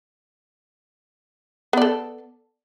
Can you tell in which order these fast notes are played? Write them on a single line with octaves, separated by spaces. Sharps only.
B3 D5 A4